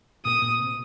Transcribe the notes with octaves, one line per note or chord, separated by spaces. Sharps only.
A#2 D#6
A#2
C3